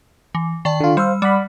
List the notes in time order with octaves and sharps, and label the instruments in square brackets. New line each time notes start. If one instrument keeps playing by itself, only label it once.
[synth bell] E3
D#3 D5 A5
[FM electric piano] D3 F4
[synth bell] G3 E6 [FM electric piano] C5 F5
[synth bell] G3 [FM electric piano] D5 F#5 B5